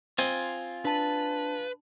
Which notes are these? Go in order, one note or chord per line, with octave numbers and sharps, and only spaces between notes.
C4 F4 D#5 G#5
D4 B4 A5